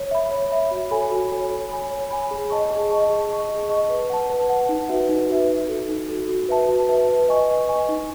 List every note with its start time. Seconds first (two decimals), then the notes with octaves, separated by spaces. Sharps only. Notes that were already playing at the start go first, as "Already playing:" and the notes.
Already playing: C#5
0.11 E5 B5
0.31 C#5
0.51 E5 B5
0.71 F#4
0.91 A4 C#5 G#5 B5
1.11 F#4
1.31 A4 C#5 G#5 B5
1.50 C#5
1.71 G#5 B5
1.90 C#5
2.11 G#5 B5
2.31 G#4
2.50 D#5 A5 C#6
2.71 G#4
2.90 D#5 A5 C#6
3.10 G#4
3.30 D#5 A5 C#6
3.50 G#4
3.70 D#5 A5 C#6
3.90 B4
4.10 F#5 A5
4.30 B4
4.50 F#5 A5
4.69 D#4
4.89 F#4 B4 E5
5.09 D#4
5.29 F#4 B4 E5
5.50 D#4
5.68 F#4 A4
5.89 D#4
6.09 F#4 A4
6.29 F#4
6.49 B4 E5 A5
6.68 F#4
6.89 B4 E5 A5
7.09 B4
7.28 D#5 G#5 C#6
7.48 B4
7.69 D#5 G#5 C#6
7.89 D#4